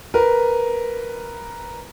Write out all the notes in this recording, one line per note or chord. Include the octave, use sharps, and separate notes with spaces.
A#4 B4